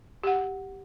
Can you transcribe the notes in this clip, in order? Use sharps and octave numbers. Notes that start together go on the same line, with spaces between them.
G4 F#5